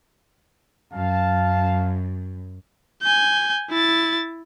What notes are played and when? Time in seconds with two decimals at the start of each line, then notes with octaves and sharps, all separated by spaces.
0.93 F#2 F5 A5
3.02 G#5 G6
3.70 E4 A6